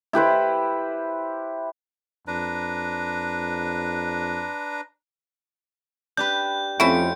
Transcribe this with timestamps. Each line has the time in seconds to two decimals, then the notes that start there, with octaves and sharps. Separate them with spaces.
0.13 E4 G4 B4 C5
2.27 F2 D4 B4 A#5
6.17 D4 G4 B4 G6
6.80 F2 A3 C4 C#4 E4 F#4 D7